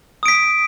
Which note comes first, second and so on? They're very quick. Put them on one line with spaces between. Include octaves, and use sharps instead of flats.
D#6 D7 B6